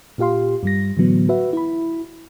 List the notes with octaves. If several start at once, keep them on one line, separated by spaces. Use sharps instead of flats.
A#2 F4 G4 F5 C6
G2 G3 A#6
A2 D3 E3 F#3 B3
F#4 B4 E5
E4 B5